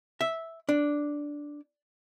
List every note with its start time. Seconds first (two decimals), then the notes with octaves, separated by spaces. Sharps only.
0.21 E5
0.69 D4